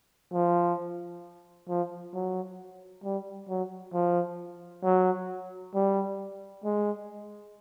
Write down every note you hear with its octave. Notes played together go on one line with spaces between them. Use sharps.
F3
F3
F#3
G3
F#3
F3
F#3
G3
G#3